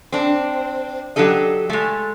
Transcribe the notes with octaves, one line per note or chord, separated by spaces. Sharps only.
C4 D4
F#3 D4 G4 A4 D#5
G#3 A3